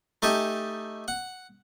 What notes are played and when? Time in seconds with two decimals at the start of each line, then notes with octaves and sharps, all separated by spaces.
0.22 A3 D#4 G4 G#5 A5
1.08 F#5